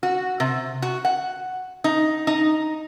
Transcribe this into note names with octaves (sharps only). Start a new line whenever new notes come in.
F#4
C3
F#4
F#5
D#4
D#4